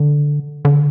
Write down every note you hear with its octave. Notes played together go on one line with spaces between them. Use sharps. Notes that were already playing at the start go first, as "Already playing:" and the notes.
Already playing: D3
D3